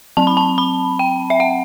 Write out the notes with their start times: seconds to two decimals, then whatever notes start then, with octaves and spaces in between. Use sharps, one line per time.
0.17 F#3 C4 A5
0.27 B5
0.37 A5
0.58 B5
0.99 G5
1.30 E5
1.40 F#5